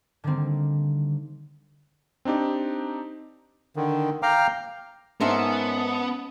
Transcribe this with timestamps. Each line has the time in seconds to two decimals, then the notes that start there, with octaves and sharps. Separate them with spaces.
0.24 D3 D#3 G3 A#3 C4
2.25 C4 D4 D#4 G4
3.76 D3 D#3
4.23 F5 G5 A#5 D6 F6
5.21 G#2 B3 C#4 A#4 C5 E5 A5 C#7